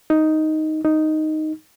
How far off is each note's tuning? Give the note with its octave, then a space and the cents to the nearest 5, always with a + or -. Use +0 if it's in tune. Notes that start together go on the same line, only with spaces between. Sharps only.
D#4 +5
D#4 +0